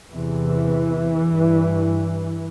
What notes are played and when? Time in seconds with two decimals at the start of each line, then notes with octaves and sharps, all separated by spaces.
0.12 E2 C3 E3
1.25 G2